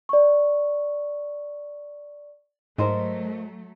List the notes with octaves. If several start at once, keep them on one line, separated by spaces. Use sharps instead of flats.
D5 C#6
G#2 F#3 A3 A#4 C5 D#5